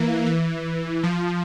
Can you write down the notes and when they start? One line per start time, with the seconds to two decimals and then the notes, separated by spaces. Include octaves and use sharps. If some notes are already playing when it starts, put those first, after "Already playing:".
Already playing: E3 A#3
0.26 E3
1.03 F3